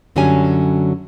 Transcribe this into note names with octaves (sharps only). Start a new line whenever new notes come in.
F#2 D3 F#3 G3 C#4 G#5